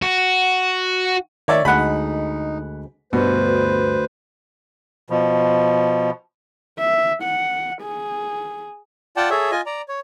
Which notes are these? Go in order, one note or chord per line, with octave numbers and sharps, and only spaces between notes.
F#4
D#3 C#5 D5 E5
D2 G#3 D#4 F#5 B5
D2 G2 B2 B4 C5
B2 F3
E5
F#5
G#4
F4 D5 F#5 G5 A5
G#4 A4 C#5 E5
F4 D#5 G#5
D5 A#5
C#5